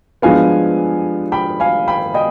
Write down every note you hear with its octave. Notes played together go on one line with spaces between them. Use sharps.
G2 F3 G#3 B3 F5 G#5
G5 B5
F5 G#5
G5 B5
D#5 G5